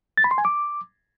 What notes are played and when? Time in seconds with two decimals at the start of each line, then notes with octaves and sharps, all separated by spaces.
0.17 A6
0.24 B5
0.31 C6
0.38 G#5
0.45 D6